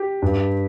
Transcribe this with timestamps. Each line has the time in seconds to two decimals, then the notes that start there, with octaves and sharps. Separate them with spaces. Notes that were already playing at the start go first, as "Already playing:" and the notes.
Already playing: G4
0.22 G2